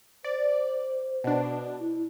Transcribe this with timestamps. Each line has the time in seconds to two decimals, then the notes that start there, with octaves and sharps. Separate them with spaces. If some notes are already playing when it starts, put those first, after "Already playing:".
0.24 C5 D5
1.24 B2 D4
1.79 E4